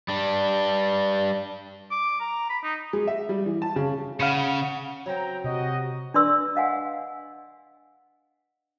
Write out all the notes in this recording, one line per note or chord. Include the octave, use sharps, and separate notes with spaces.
G3 D4
D6
A#5
B5
D#4
G#3
E5
G3
E3
A5
C#3
C#3 F5 F#5 B5 C#7
F#3 C4 G5 A#5
C3 F#4 D#5
D4 B4 D5 C6 E6
D#5 F5 F#5 G#5